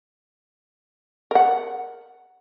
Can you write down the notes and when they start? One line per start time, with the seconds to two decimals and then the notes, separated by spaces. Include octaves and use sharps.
1.31 A#4 F#5